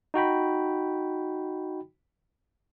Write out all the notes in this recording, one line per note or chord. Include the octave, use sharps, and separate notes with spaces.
D#4 F#4 G5 B5